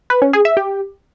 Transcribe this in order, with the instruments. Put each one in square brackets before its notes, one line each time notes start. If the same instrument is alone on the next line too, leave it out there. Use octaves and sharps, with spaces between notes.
[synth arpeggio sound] B4
C#4
G#4
E5
G4